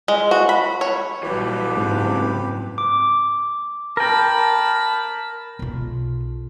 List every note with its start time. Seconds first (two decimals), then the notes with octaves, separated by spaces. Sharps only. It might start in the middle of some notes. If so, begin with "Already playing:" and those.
0.08 G#3
0.31 F#4
0.49 B5
0.81 C#5
1.23 A#1 E3 F#3 G3 G4 B4
1.77 F#1 G#2 C#3 C4
2.78 D6
3.97 A#4 G5 A5 B5
5.59 B1 F4